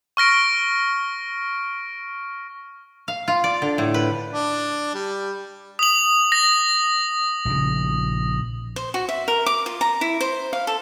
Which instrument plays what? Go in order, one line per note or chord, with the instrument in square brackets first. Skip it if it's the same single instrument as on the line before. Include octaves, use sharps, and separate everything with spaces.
[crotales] C#6 F6 A#6 D7
[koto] F5
F4
D5
D3
A2
B4
[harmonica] D4
G3
[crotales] D#6 F#7
A#6
[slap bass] A#1 C#3
[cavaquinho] C5
F#4
E5
A#4
D6
F4
A#5
E4
C5
F5
A4